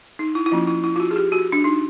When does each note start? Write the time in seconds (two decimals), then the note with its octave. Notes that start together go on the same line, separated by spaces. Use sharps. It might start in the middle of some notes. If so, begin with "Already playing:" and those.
0.19 D#4
0.35 E4
0.46 E4
0.51 F3 A#3 C#4 F4
0.67 E4
0.84 E4
0.96 F4
1.00 F#4
1.11 G#4
1.16 G4
1.32 F#4
1.52 D4
1.64 D#4